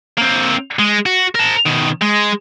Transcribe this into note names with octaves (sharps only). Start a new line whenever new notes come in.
A#3 C4
G#3
F#4
A#4 A5
B2 D#3
G#3